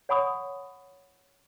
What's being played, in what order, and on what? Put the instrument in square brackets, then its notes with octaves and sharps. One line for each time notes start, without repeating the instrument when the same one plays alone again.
[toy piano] C#5 F#5 G#5 B5 C#6 D#6